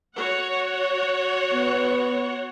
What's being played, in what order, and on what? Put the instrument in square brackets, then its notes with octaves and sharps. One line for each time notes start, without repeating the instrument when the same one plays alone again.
[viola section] F#4 C#5 F#5
[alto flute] B3